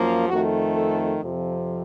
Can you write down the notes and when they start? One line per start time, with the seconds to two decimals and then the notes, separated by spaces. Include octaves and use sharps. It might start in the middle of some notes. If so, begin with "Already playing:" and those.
Already playing: F#2 F3 A#3
0.28 F2 D#3 A3 F#4
0.75 A4
1.21 F2 C3 F3